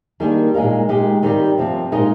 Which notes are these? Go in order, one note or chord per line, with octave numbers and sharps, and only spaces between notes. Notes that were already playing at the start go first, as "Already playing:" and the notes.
D#3 G3 A#3 D4 G#4
A#2 G#3 D#4 A#4 F5
A#2 G#3 D#4 G4
D#3 G3 C4 D#4 G4
C3 F3 C4
A#2 G#3 D#4 A#4 D#5